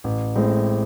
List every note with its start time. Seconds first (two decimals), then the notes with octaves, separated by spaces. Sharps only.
0.04 A1
0.35 A2 G#3 C4